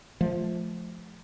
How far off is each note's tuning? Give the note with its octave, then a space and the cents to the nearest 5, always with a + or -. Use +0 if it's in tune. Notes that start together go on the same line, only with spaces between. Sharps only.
F3 +0 A3 -25